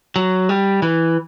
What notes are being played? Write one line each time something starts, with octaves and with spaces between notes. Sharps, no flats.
F#3
G3
E3